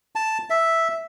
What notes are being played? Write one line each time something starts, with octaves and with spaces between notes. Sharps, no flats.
A5
E5